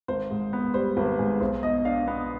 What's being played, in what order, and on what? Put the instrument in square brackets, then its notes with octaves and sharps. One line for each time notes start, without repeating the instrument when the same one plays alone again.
[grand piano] G#1 [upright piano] C5
[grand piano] G#2
B3
[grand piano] G3 [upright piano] C5
[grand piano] G#1 [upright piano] B4
[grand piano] G#2 [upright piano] G#4
[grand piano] B1 [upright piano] C5
[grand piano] B2 [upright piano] D#5
[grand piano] D4 [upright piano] F5
[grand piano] B3